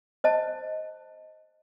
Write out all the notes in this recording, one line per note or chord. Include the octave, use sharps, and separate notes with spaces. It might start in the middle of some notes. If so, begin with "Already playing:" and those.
C5 D#5 A5